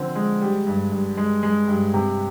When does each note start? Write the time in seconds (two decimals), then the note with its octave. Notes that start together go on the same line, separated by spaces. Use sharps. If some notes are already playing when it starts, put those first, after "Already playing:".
Already playing: D3 F3 C4
0.15 G#3
0.41 G3
0.67 G2
0.92 G2
1.17 G#3
1.43 G#3
1.68 G2
1.94 C3